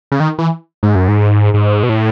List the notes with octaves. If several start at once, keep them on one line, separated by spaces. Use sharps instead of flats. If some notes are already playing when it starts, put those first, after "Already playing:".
C#3
D#3
E3
G#2
F#2
G#2
G#2
B2
A2